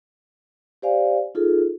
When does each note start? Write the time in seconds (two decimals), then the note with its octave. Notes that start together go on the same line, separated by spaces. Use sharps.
0.82 G4 C5 D5 F5 G#5
1.35 D#4 F4 G#4 A4